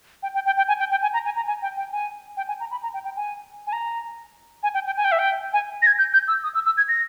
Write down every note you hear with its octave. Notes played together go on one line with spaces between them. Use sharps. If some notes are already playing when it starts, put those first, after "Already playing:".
G5
G5
G5
G5
G#5
G5
G5
G#5
A#5
G#5
A#5
G#5
G5
G5
G#5
G5
G#5
A#5
B5
A#5
G5
G5
G#5
G#5
A#5
G#5
G5
G5
G#5
G5
E5
G5
G#5
A#6
G#6
G6
G6
E6
D#6
E6
E6
G#6
A#6